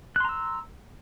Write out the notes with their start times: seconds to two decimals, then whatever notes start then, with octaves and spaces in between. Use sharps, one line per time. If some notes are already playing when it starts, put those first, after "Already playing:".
0.16 F#6
0.20 C6
0.25 A#5
0.29 E6